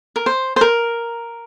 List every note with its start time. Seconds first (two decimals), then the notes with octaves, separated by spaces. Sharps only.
0.16 A#4
0.26 C5
0.56 C5
0.61 A#4